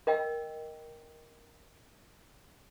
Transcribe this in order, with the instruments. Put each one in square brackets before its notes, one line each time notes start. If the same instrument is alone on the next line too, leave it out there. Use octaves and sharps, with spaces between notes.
[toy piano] A#4 D#5 G5 E6